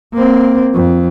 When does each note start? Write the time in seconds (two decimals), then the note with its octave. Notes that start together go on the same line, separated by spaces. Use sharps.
0.14 A#3 C4
0.73 F2